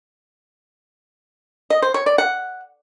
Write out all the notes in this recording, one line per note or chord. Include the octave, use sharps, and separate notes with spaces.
D#5
C5
C#5
D5
F#5